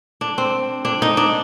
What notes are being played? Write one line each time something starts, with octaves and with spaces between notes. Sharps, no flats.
D4
C4
D4
D#4
D4